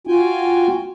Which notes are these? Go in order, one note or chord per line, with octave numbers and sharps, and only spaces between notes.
F4 F#4 G5 G#5